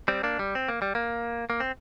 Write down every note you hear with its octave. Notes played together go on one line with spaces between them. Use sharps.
G3 C4
A#3 D4
G3
C4
A#3
G3
A#3
A#3
C4